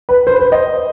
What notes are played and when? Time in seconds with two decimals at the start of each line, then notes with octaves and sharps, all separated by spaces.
0.09 B4
0.27 C5
0.39 C5
0.52 D#5